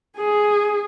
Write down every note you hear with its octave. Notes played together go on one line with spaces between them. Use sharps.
G#4